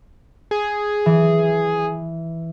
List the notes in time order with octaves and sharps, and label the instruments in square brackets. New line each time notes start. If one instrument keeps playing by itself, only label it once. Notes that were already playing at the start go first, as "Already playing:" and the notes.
[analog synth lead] G#4
[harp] E3